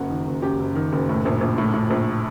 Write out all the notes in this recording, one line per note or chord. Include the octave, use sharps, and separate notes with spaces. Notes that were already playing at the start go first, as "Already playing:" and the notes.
Already playing: F#1 F#2 F#4
D#3
F#1
F#2 G4
F#1
D#3
F#1
A2
A#1
A#1
A2
A2
A#1